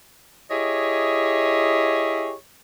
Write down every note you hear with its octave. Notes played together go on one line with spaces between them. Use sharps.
E4 G4 G#4 C#5 D#5